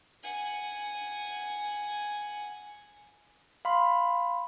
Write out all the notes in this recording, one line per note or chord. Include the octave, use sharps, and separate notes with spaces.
F#5 G#5
F5 B5 C6